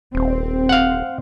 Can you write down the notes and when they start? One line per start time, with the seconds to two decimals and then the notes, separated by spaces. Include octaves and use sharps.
0.15 D#1 C4
0.69 F5 F#5